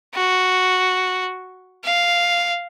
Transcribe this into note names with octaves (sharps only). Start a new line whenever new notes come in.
F#4
F5